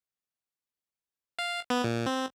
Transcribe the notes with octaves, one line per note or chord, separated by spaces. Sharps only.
F5
B3
A#2
C4